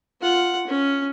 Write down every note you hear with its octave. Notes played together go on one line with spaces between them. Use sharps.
F4 F#5
C#4